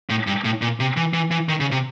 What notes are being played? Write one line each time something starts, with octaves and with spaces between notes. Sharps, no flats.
A2
G2
A2
A#2
C3
E3
E3
E3
D#3
C#3
C3